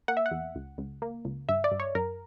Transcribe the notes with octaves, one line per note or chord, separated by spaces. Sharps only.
A#3 F#5
E5
F#5
E2
C#2
C#2
A#3
C#2
G2 E5
D5
G2
C#5
F#2 A#4